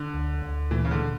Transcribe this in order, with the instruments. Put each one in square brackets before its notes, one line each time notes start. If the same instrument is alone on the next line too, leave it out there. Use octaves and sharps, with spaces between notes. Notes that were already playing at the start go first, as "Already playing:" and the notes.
Already playing: [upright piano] D3 [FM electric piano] D4
[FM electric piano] D2
D2
[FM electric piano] A#2 [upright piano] E3
[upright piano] C#3
D3
[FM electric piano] A#2